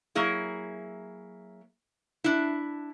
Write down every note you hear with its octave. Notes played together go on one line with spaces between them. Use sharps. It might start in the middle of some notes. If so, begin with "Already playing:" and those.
F#3 A#3 E4 G#4
D4 E4